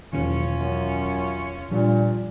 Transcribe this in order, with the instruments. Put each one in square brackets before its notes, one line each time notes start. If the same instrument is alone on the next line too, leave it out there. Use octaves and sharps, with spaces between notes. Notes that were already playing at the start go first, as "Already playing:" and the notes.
[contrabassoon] F#1 [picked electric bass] E2 B2 D#3 [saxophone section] C#4 F4
[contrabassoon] F#2
[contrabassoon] G2 [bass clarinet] A#2 [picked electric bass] F3 G3